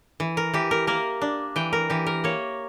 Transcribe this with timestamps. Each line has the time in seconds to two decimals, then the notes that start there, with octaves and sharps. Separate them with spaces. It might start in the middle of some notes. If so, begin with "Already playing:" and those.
0.20 E3
0.37 A#4
0.54 E3 G4
0.71 A#4
0.87 A#3 A#4
1.21 D4
1.56 E3 G5
1.73 A#4
1.90 E3 G4
2.07 A#4
2.24 A#3 C#5